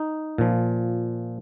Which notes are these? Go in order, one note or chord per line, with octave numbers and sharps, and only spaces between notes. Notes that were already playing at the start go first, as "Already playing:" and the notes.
Already playing: D#4
A#2 F3